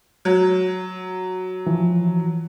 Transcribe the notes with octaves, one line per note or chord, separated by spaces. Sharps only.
F#3
E3 F3